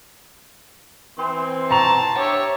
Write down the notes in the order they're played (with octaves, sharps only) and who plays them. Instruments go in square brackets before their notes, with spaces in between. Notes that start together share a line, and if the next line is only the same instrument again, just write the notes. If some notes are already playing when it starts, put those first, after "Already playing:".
[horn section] E3 C4 C6
[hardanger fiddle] A5 [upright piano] A#5 C#6 F7
[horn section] D4 G4 E5 [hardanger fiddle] C#5